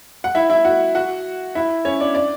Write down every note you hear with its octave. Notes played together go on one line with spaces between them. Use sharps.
F#5
E4 E5
E4 E5
F#4 F#5
F#4 F#5
E4 E5
C#4 C#5
D4 D5
D4 D5